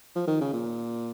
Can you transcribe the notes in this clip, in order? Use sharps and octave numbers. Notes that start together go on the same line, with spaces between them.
F3
D#3
C#3
A#2